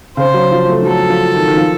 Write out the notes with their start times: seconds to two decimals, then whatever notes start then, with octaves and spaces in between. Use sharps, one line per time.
0.17 C#3 C5
0.34 F#3
0.52 F3
0.69 A3
0.82 F3
0.87 F#3 A4
1.10 F3
1.34 D#3
1.48 D#3
1.57 F3